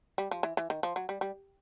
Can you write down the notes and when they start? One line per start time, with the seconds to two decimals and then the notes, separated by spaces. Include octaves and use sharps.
0.18 G3
0.31 F3
0.43 E3
0.57 E3
0.70 D#3
0.83 F3
0.96 F#3
1.09 G3
1.21 G3